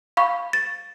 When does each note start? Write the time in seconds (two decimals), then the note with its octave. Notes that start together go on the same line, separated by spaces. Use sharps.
0.17 F5 B5 C#6
0.53 A6